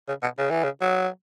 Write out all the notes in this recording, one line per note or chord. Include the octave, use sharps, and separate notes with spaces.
C#3
B2
C#3
E3
C#3
F#3